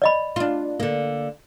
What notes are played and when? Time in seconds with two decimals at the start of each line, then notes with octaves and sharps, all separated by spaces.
0.02 D5 D#5 B5
0.36 D4 F4
0.80 D3 A#3